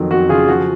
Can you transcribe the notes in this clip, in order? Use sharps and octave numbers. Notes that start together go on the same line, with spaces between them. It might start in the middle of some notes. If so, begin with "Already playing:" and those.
Already playing: F2 D#3 F#3
F2 F#4
C#3 F4 G#4
F3 F#4